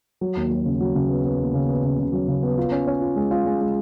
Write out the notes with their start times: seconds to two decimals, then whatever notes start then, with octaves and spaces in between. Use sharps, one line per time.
0.21 F#3
0.37 D#2
0.51 F#3
0.66 C#3
0.81 F#3
0.95 C#3
1.09 B3
1.24 B3
1.39 D#2
1.54 C#3
1.69 B3
1.83 C#3
1.98 C#3
2.13 F#3
2.28 C#3
2.43 B3
2.58 F4
2.71 C#4
2.87 C#4
3.01 F4
3.16 G#3
3.31 F4
3.46 G#3
3.61 G#3